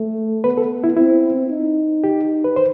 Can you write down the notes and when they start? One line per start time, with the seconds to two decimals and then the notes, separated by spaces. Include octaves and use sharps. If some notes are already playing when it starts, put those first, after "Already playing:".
Already playing: A3
0.44 B3 B4
0.57 A4
0.84 E4
0.97 C4 E4
1.50 D#4
2.04 G4
2.44 B4
2.56 C5